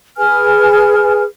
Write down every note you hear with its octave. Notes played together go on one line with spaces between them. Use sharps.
G#4 B4 G#5 F6